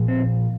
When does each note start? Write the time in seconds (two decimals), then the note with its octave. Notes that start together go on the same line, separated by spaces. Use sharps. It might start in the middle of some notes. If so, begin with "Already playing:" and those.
Already playing: A#2 F3
0.08 C4